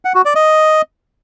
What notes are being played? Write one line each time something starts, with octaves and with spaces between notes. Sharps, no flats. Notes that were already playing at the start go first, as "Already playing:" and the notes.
F#5
F#4
D5
D#5